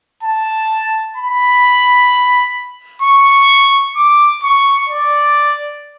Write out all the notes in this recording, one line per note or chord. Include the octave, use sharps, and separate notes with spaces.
A5
B5
C#6
D6
C#6
D5